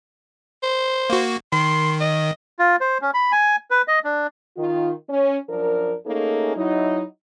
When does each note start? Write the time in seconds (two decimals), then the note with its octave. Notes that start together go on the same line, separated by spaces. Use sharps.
0.63 C5
1.10 A#3 F#4
1.52 D#3 C6
2.00 D#5
2.59 F4
2.81 C5
3.02 C#4
3.14 B5
3.32 G#5
3.71 B4
3.88 D#5
4.04 D4
4.57 D#3 F4
5.09 C#4
5.49 F#2 F3 D4 A#4
6.06 A3 A#3 C#4 D#4 G#4 A4
6.56 F#3 D#4 E4